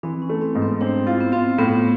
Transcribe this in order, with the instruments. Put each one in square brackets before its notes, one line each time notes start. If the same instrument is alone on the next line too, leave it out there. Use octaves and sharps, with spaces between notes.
[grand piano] E3 [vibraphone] C4
[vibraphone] C#4
[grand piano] A3
[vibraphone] C4
[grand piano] G#2
[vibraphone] B3
[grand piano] C4 [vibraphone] D4
[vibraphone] E4 [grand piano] F4
[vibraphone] B3
[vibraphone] C4 [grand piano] F4
[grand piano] A2 [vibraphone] B3